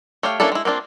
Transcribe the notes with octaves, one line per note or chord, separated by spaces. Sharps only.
A3 G4 C#5 F5
A#3 C#4 D4 E4 A4
G#3 E4
A#3 C4 D4 F4